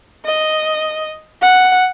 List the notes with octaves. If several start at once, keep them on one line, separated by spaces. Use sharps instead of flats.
D#5
F#5